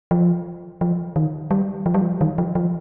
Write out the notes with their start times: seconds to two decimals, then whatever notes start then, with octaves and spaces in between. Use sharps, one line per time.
0.11 F3
0.81 F3
1.16 D#3
1.51 G3
1.86 F3
1.94 G3
2.02 F3
2.21 D#3
2.38 F3
2.55 F3